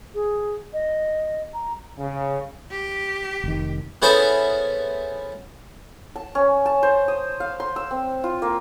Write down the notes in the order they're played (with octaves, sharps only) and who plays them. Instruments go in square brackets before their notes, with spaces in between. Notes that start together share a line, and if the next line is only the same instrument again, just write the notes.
[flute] G#4
D#5
A#5
[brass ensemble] C#3
[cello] G4
[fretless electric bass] F1 D#3
[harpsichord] B3 C#4 E4 G#4 A4 C5
[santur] A5
C#4
A5
C5
D#6
F5
C6
E6
C4
F4
A#3